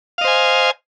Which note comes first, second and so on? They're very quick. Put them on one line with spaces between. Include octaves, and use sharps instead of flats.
F5 D#5 C5 G#5